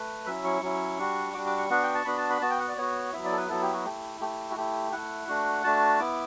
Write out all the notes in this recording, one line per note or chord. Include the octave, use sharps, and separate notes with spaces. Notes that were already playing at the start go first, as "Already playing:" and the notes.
Already playing: A3 B4
F#3 C#4 E4 E5
C#6
F#3 C#4 E4
G3 D4 F#4
G3 D4 F#4 D6
D6
C#6
B3 D4 F#4 F#5
G5
A5
B3 D4 F#4 B5
A5
B5
B3 F#4 A5
G5
F#5
D5
B3 F#4 C#5
F#3 B3 E4 E5
D5
A4
B4
F#3 B3 E4 A4
G4
F#4
A3 E4 G4
A3 E4 G4
F#4
A3 E4 G4
A3 E4 F#5
A3 D4 F#4
A3 D4 F#4 A5
B3 E4 D6